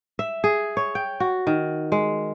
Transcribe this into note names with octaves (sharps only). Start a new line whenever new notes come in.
E5
G#4
C#5
G5
F#4
D#3
G#3